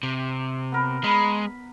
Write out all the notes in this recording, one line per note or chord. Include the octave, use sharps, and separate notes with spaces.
C3
B3 A#4
G#3 B5